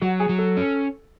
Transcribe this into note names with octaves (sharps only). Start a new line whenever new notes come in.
F#3 F#4
G#4
F#3
A4
C#4